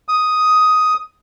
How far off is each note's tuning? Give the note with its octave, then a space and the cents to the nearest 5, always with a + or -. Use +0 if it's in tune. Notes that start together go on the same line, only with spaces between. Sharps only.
D#6 +5